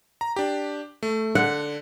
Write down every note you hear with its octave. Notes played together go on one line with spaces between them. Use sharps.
A#5
D4 G4
A3
D3 F#5